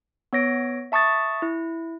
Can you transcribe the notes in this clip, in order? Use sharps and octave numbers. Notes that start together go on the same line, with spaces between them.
B3 C#5 A#6 D7
E5 A5 C#6 D#6 A6
E4